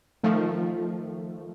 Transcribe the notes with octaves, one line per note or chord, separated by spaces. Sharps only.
D#3 F3 A3